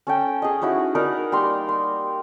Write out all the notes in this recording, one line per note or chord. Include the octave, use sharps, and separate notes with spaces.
C#4 A4 G5
G#4 D#5
C#4 D#4 E4 F#4
D#4 A#4 B4 D5
G3 A#3 A#5 C6
C6